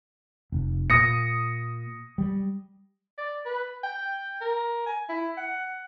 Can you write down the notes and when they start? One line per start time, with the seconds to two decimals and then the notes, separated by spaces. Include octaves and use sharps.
0.52 F1
0.90 A#2 D#6 A#6 C#7
2.18 G3
3.18 D5
3.46 B4
3.83 G5
4.41 A#4
4.86 G#5
5.09 E4
5.37 F#5